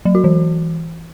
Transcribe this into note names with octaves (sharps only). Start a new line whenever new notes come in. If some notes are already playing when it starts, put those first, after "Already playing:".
F#3
F#4
E3